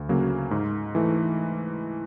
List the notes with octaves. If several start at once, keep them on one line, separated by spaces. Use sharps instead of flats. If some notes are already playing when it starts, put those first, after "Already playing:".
Already playing: D2
C#3 F#3 A#3
G#2
E3 A3